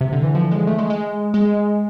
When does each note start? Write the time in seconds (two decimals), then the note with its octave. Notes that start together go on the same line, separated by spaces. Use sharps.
0.01 C3
0.12 D3
0.23 E3
0.35 F3
0.51 G#3
0.67 A3
0.79 G#3
0.90 G#3
1.34 G#3